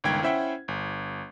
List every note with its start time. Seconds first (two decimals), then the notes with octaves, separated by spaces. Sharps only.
0.04 G1 C#2 D#3 G5 G#6
0.22 C#4 E4 C5 E5 F#5 G5
0.68 G1